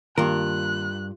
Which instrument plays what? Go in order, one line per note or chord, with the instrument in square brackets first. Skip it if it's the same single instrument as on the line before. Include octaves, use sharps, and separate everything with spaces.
[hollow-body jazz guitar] G2 A#4 [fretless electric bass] D#3 A#3 [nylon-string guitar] F4 [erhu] F#6